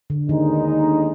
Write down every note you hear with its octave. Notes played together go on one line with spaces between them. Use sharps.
D3
D#2 D3 D#3 G#3 B3 D#4